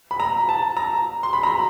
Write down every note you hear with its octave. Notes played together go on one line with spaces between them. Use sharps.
B5
A#5
A5
A#5
C6
B5
A#5
B5